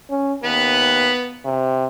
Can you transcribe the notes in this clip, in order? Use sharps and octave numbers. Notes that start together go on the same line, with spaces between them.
C#4
D#2 B3 B4
C3